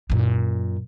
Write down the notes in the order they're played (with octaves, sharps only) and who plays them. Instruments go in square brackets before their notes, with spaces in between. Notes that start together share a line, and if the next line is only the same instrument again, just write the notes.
[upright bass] F#2 A#2